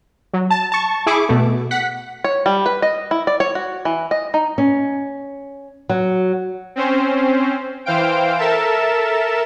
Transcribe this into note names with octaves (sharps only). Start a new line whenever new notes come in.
F#3
A5
A5 C#6
E4 G#4 C#6 D6
B2 A3
F#5 B6
C#5
G3
B4
D#5
E4
D5
C#5
F#4
E3
D#5
D#4
C#4
F#3
C4 C#4 C5
E3 C5 F5 G5 D7
A4 A#4 E5 A5 E7